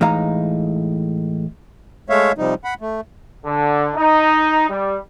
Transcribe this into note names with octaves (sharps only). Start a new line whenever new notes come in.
A2 E3 G#3 D#4 F5 A#5
G#3 A3 C#5 E5 F5
C3 F3 G3 D#4
F#5 B5
A3
D3
D#4
G3